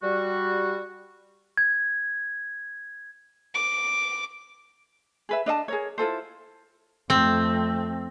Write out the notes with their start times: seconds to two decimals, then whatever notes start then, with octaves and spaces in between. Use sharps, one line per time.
0.03 G3 F#4
1.57 G#6
3.54 D6
5.29 G#4 B4 E5
5.46 D4 D#5 E5 A5
5.68 G#4 A#4 C#5
5.98 E4 F4 A4 C5
7.10 F2 A3 C4